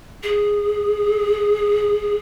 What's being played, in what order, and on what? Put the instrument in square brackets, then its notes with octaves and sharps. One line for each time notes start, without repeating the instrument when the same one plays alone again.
[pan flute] G#4